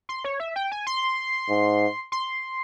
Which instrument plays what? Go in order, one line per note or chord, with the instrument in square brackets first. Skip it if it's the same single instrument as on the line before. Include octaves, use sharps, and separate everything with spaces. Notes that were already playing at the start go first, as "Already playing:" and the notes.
[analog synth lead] C6
C#5
E5
G5
G#5
C6
[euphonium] G#2
[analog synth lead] C6